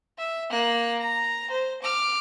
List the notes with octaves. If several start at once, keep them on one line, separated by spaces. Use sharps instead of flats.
E5
A#3 F#6
A#5
C5
D6 F6